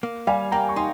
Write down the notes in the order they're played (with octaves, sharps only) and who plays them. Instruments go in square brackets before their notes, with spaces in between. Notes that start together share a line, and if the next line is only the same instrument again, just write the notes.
[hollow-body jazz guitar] A#3
[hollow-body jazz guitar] G3 [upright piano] F5 G#5
[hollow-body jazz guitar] A#3 [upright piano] G5 A#5
[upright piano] C#6
[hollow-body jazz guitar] D#4 [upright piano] G#5 C6